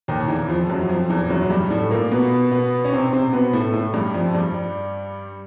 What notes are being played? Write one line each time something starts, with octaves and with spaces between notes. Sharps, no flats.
D#2 D#3
E2 E3
F2 F3
F#2 F#3
F2 F3
E2 E3
F#2 F#3
G2 G3
A2 A3
A#2 A#3
B2 B3
B2 B3
C#4
C3 C4
C3 C4
B2 B3
A2 A3
A2 A3
G2 G3
F2 F3
G2 G3